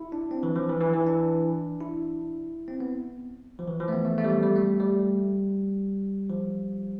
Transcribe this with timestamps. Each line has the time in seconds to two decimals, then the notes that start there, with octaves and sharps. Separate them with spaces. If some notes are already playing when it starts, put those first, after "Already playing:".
Already playing: E4
0.12 D4
0.31 C4
0.43 E3
0.56 F3
0.69 E3
0.81 E3
0.93 E3
1.06 D4
1.80 E4
2.68 C4
2.80 B3
3.59 F3
3.68 E3
3.80 F3
3.88 A3
3.93 B3
4.05 A3
4.18 A3
4.24 G3
4.30 A3
4.42 G3
4.56 A3
4.80 G3
6.30 F3